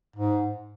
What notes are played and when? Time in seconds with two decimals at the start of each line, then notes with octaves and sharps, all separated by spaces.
0.16 G#2